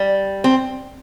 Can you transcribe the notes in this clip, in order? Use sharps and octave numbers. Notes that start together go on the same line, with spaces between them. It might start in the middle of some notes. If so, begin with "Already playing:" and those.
Already playing: G3
C4